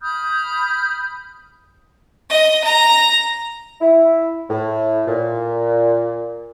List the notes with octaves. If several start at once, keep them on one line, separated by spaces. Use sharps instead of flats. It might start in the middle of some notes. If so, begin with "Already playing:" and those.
B5 D#6 F6 G6
D#5
A#5
E4
A2
A#2